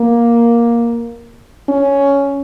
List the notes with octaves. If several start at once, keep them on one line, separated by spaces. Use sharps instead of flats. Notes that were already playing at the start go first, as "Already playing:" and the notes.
Already playing: A#3
C#4